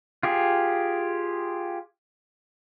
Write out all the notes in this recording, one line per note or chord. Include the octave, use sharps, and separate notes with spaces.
F4 G4 G#4